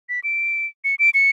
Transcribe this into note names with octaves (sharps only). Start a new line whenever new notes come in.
B6
D7
C#7
D7
C#7